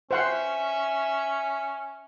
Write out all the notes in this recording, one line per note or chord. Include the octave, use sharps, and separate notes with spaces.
C#4 C5 E5 F#5 C6